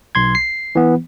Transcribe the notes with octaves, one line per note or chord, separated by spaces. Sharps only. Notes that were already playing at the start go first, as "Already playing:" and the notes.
B1 C6 G#6
C7
E3 B3